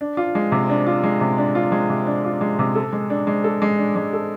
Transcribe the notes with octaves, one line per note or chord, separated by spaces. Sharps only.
D4
F4
G#3
C3
D4
F4
G#3
C3
D4
F4
G#3
C3
D4
F4
G#3
C3
A4
G#3
D4
G#3
A4
G#3
D4
G#3
A4